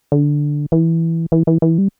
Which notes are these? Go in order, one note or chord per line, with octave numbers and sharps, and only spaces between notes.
D3
E3
E3
E3
E3
G3